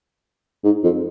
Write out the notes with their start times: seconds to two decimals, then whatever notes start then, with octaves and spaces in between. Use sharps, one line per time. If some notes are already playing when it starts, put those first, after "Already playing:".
0.64 G#2
0.83 F2